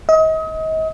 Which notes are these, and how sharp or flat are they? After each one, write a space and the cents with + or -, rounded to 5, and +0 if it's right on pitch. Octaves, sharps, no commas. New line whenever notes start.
D#5 +35